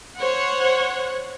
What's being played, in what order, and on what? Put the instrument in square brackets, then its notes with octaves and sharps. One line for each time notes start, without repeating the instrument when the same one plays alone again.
[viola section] C5 C#5 F#5